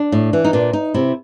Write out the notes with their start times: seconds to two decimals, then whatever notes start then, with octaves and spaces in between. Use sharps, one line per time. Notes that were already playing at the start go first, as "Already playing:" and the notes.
Already playing: D4
0.12 A2
0.33 E3
0.44 D#4
0.53 A#2 D4
0.73 D#4
0.94 C3 E4